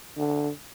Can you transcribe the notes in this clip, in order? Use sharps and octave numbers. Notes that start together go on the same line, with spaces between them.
D3